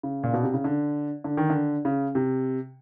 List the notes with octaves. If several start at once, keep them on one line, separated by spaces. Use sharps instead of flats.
C#3
A#2
B2
C3
C#3
D3
D3
D#3
D3
C#3
C3